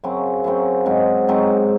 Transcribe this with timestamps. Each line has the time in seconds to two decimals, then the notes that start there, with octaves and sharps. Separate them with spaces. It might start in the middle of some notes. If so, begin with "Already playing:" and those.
0.03 F#2 C#3 F#3 C4
0.44 F#2 C#3 F#3 C4
0.86 G#2 F#3 C4
1.28 G#2 F#3 C4